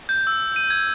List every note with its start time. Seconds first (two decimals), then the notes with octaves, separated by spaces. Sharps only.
0.09 G6
0.27 E6
0.56 D#7
0.70 G#6